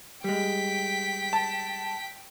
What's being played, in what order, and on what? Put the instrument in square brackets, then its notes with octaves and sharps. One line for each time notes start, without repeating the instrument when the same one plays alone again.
[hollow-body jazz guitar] G3 G#3 [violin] G5 B6
[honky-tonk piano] A5